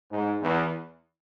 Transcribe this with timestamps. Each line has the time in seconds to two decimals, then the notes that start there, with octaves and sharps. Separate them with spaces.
0.11 G#2
0.42 E2